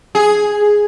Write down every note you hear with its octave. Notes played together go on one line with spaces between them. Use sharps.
G#4